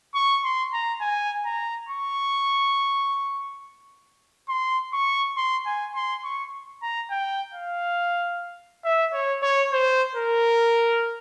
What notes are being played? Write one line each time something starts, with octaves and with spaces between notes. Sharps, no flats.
C#6
C6
A#5
G#5
A#5
C#6
C6
C#6
C6
G#5
C6
C#6
A#5
G5
F5
E5
C#5
C#5
C5
A#4